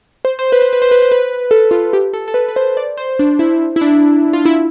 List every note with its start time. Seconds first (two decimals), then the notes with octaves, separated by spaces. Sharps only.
0.25 C5
0.39 C5
0.52 B4
0.62 C5
0.73 B4
0.82 C5
0.91 B4
1.02 C5
1.12 B4
1.51 A4
1.71 F4
1.93 G4
2.13 A4
2.28 A4
2.34 B4
2.48 B4
2.56 C5
2.77 D5
2.97 C5
3.19 D4
3.39 E4
3.76 E4
3.81 D4
4.33 F4
4.45 E4